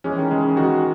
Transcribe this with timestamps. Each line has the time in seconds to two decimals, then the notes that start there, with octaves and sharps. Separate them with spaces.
0.04 E3 G#3 C#4
0.17 D#3
0.31 C#3 G#3
0.43 C#3
0.56 D#3 F#4